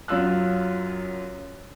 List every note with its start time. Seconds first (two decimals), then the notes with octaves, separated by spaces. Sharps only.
0.08 F#2 F#3 F4 E6 F#6